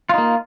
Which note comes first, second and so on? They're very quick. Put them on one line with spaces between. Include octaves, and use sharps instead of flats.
F4 D#4 A#3